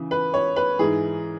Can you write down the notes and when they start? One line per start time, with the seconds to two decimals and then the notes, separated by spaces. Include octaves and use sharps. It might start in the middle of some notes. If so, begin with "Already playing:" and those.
Already playing: C#3 E3
0.11 B4
0.34 C#5
0.56 B4
0.79 G#2 E3 G#4